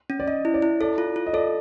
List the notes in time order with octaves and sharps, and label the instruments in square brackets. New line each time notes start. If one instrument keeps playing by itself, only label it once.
[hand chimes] C#4
[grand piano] D5
[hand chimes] C#4 [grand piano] D#5
[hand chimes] E4
[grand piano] D5
[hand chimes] E4
[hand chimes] A4 [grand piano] D5
[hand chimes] F4
F4
[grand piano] D#5
[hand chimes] A4 [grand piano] D5